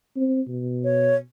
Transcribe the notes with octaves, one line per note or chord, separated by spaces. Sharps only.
C4
B2
C#5